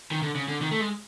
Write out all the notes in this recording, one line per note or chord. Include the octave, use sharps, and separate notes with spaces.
D#3
D3
C#3
D3
D#3
A3
G#3